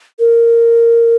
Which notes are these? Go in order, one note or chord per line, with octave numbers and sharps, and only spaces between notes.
A#4